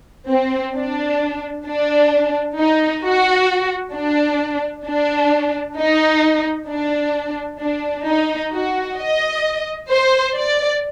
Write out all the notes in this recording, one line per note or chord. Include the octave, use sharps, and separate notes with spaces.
C4
D4
D4
D#4
F#4
D4
D4
D#4
D4
D4
D#4
F#4
D#5
C5
D5